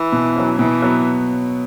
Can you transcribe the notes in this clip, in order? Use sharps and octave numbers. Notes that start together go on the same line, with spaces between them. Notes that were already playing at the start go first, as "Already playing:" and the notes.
Already playing: E3
B2
F#3 C#4
B2 E3
F#3 B3